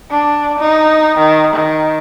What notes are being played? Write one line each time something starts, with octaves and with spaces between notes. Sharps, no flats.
D4
D#4
D#3
D#3